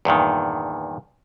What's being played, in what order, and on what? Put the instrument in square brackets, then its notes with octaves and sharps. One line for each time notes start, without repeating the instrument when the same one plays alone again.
[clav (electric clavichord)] E2 G2 A#2 D#3